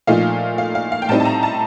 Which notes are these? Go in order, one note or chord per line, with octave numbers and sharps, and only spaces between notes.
A#2 F3 A3 D#4 F5
F5
F5
F5
G5
A2 G3 C4 D#4 A5
A5
A#5
A5